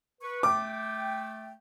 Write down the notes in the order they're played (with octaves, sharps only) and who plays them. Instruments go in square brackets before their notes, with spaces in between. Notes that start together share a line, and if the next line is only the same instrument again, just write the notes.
[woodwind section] B4 C#6
[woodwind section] A3 G5 [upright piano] D6